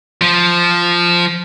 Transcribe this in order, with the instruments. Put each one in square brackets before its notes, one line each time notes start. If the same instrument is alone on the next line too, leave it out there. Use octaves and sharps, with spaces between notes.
[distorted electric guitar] F3